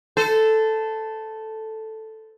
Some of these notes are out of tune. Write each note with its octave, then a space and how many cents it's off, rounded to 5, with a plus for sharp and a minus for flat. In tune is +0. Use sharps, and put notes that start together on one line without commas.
A4 +0 C5 -30